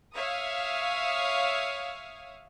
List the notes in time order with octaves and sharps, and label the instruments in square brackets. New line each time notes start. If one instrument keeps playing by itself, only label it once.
[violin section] C#5 E5 F5 D#6